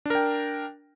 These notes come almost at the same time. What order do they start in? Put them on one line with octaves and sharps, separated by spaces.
D4 A#4 G5